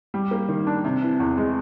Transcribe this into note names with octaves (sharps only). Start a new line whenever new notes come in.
G3
A#3
D#3
D4
C3
E3
E2
G#3